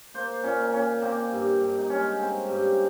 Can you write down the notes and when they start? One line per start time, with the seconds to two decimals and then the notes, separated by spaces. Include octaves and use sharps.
0.14 A#3 C5
0.43 A#2 C#4
0.73 A#2 C#4
1.02 A#3 C4
1.32 G2
1.60 G2
1.78 D#4
1.90 G#3 C#4
2.19 C4
2.48 G2